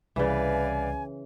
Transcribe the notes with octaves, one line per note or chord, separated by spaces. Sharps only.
C2 C#3 E3 B4 D5 F5 G#5